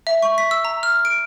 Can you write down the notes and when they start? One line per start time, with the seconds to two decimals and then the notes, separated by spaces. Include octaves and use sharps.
0.07 E5
0.22 C#6
0.38 B6
0.51 E6
0.65 A#5
0.83 F6
1.05 D7